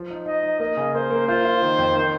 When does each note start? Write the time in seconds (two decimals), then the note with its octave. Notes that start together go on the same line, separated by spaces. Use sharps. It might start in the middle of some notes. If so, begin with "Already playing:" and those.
Already playing: F3
0.10 D#4
0.26 D#4 D#5
0.43 D#4
0.60 A#3 D#5
0.77 C#3
0.95 A#3 C5
1.10 A#3
1.27 F4 C5
1.45 F4
1.62 D#3
1.78 F2
1.95 D#3